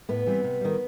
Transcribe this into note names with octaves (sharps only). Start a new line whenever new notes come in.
A2 B3 B4
E3 G3 C4
C3
D#3 G3